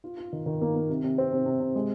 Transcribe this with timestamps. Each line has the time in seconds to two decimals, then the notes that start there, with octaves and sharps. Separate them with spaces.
0.04 F4
0.17 F4
0.33 D#3
0.46 D#3
0.61 A#3
0.75 A#3
0.89 C3
1.04 C3
1.18 C4
1.33 C3
1.46 C3
1.60 C3
1.75 G#3